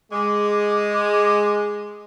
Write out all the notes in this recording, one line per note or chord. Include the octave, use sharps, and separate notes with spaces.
G#3 D6